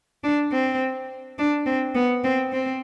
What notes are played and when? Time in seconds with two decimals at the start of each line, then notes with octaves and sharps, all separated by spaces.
0.24 D4
0.52 C4
1.38 D4
1.66 C4
1.95 B3
2.24 C4
2.52 C4